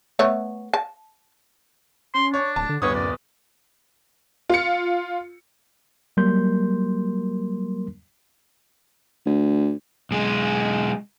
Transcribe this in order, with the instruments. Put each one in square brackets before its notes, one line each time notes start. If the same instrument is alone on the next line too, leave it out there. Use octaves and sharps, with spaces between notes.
[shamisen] A3 B3 C#5
A5
[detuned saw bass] C#4 [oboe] C6
[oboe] D4 [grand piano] C#5
[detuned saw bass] D1 [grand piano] A5
[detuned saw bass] D3
[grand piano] D1 B3 D#6 [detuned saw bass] G2 [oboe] C#5
[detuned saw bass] F#2 [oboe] D5
[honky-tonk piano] F4 C#7
[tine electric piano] F#3 G3 A#3 A#4 C6 G6
[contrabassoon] D2
[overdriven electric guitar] B1 G#3